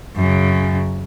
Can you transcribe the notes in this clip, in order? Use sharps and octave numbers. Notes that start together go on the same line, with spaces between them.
F#2 C#3